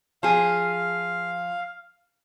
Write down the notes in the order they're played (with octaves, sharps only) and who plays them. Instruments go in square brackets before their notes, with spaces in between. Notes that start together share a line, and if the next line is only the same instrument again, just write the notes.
[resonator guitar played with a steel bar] F3 G#4 [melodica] F5